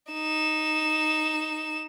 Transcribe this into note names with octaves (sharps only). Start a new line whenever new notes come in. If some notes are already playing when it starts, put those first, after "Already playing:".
D#4 E7